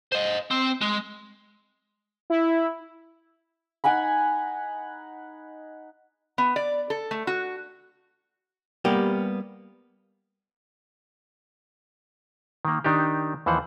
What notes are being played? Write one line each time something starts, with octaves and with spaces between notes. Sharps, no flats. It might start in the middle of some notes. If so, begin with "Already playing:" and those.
C5 D#5
C4
G#3
E4
D#4 F#5 G#5 B5
B3
D5
A4
A3
F#4
G3 A#3 B3 G4
D#3 A#3
D#3 D4 D#4 G4
D#2 E3 F3 C5 F#5